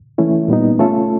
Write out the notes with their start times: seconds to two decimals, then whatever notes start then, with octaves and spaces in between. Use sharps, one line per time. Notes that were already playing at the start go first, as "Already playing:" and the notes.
0.18 E3 A3 C#4 E4
0.48 A#2 G3 B3 D#4
0.79 A3 C#4 F4 A4